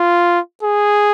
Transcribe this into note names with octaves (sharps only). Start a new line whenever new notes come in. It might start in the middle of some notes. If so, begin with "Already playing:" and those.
Already playing: F4
G#4